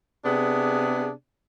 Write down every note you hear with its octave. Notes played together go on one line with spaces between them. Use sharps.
C3 B3 D4 G#4